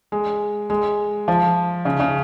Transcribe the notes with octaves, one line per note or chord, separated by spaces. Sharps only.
G#3
G#3
F3
C#3
C#3